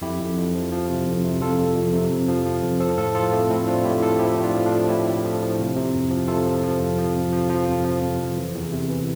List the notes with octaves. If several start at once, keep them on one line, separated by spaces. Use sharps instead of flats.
F2 E4 G4
F2
F2
F3
F3
C3
F2
C3
F2 F4 A4
F2
F2
C3
F2
F3
F3
F2
F3 A4 C5
A2 F4 A4
F3 F4 A4
F3 A3 C4
A2 C4 E4
A2 D4 F4
A2 E4 G4
A2 F4 A4
F3 E4 G4
A2
D4 F4
F3
D4 F4
F3
A2 E4 G4
A2
F3
F3
C3
C3
F2
F3
C3 F4 A4
F3
F3
F2
F3
F2
F3
F3
F2
F3
F2
F2
E3
E2
C3
E3